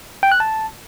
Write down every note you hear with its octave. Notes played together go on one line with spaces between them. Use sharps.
G5
F#6
A5